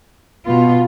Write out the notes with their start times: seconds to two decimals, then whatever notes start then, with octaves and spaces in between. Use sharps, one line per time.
0.46 B2 B3 F4